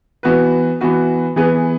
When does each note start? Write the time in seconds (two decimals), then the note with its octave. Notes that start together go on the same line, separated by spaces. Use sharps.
0.23 E3 B3 F#4 B4
0.81 E3 B3 F#4 B4
1.36 E3 B3 G#4 B4